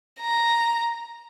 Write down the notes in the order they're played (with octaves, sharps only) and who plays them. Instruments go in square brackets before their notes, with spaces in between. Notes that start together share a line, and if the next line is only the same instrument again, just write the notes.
[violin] A#5